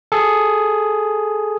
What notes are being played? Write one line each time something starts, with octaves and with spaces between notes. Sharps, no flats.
G#4 A4